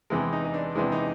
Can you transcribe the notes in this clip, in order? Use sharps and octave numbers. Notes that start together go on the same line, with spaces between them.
E2 C3 E3 G#3
D#4
D#4
D4
E2 C3 E3 G#3 D4
D#4